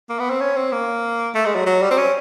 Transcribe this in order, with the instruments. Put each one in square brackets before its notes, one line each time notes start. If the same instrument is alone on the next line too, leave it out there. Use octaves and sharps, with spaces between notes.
[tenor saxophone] A#3
B3
C4
C#4
C4
A#3
A3
G#3
F#3
F#3
G3
C4
C#4